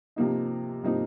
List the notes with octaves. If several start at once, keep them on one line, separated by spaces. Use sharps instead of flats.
C3 F3 A#3 D#4
C3 F3 A#3 D#4